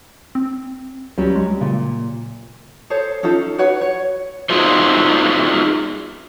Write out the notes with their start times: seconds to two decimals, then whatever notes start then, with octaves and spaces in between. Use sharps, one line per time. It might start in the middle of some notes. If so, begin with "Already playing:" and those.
0.35 C4
1.18 C#2 F#3 G3 C#4
1.36 G#3
1.61 A#2 C#3
2.90 G#4 A4 C5 C#5
3.23 C#4 D#4 F4 A4
3.58 F#4 B4 C#5 F#5
3.81 C#5
4.50 D#4 F4 F#4 G#4 C5